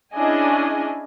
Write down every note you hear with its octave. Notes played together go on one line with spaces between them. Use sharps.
C#4 D4 E4 G#4 D#5 G#5